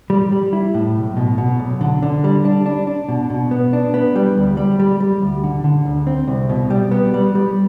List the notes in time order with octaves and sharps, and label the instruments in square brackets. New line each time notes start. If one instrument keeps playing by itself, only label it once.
[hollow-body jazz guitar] G3
G3
E4
A2
B1
B2
B2
B1
D3
D3
G3
D4
D4
D4
B2
B2
B3
D4
B3
G3
D2
G3
G3
G3
D2
D3
D3
D2
C4
C2
B2
G3
B3
G3
G3